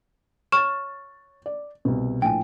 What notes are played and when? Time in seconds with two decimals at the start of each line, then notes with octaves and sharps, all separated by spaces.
0.52 C#5 C#6 F6 A6 E7
1.46 D5
1.85 C2 B2
2.22 A#1 A2 F3 G5 G#5